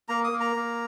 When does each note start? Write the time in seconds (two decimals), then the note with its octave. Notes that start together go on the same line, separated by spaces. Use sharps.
0.09 A#3 A#5
0.24 D#6
0.32 A#3
0.40 A#5
0.56 A#3